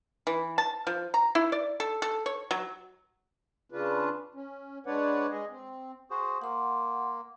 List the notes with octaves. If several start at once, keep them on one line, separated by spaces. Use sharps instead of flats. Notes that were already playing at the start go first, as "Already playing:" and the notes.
E3
A5
F3
A#5
E4
D5
A4
A4
C#5
F#3
C#3 D4 F4 B4
C#4
G#3 D4 B4 C#5 D5 F#5
G#3 G#4 D#5
C4
F#4 G#4 C5
A#3 F#5 C6